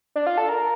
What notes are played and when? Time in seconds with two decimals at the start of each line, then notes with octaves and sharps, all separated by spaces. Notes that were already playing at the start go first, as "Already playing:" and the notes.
0.16 D4
0.27 F4
0.38 A4
0.49 A#4